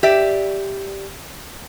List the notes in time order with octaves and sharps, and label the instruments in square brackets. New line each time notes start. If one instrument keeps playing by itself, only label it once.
[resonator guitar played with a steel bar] G4 D5 E5